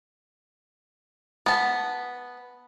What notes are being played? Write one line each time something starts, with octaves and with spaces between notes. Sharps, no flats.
B3 A5